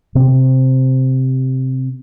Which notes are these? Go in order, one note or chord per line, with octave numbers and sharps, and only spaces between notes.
C3 C4